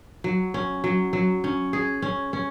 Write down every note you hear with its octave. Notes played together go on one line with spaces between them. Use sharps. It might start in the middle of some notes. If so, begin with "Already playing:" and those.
F#3
C#4
F#3
F#3
C#4
G#4
C#4
C#4